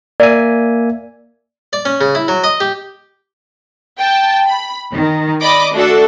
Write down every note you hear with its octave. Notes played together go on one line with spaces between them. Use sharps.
A#3 D5 E5 G#5
D5
C#4
C#3
E4
F#3
D#5
G4
G5 A5
B5
D#3
D5 D#5 B5 D6
A3 D4 F#4 A4